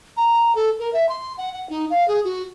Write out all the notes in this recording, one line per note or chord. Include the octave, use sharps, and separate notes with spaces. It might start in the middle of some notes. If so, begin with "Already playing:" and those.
A#5
A4
A#4
E5
C6
F#5
F#5
D#4
F5
G#4
F#4